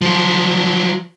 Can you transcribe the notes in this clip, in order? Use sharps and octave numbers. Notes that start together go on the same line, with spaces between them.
F3 F#3